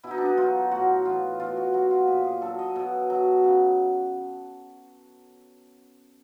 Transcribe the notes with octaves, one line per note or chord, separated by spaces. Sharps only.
B2 E4
D#4
D4
D#4
F#3 F4
A2 F#4
E3 F4
B2 F4
F#4
F#3 F#4
F4
A#2 G4
G#4
F#3 A4
D#5
B2
F#3
C#3